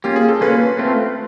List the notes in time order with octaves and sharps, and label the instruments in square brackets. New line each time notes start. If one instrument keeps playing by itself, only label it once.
[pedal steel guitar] A#3 C#4 F4 [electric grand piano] G4
[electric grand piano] G#4
A4
[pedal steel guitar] A#3 C#4 F4 [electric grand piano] B4
[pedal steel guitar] A3 C4 F4